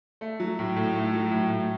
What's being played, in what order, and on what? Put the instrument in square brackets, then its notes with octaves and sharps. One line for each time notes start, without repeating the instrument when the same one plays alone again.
[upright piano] A3
F#3
A2
A2
A3
F#3
A2
A2